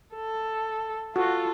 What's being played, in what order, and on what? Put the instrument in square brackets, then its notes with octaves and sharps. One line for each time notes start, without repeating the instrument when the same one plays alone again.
[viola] A4
[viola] F4 A4 [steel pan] F#4